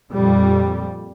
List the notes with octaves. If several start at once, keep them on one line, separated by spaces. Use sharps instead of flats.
F2 A#2 G3